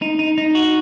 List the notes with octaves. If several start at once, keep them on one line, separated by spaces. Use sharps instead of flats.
D#4
D#4
D#4
F#4